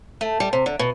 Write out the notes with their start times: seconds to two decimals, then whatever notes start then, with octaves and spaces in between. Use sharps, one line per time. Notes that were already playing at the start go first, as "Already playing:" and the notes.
0.21 A3
0.40 G3
0.53 C3
0.66 D3
0.79 B2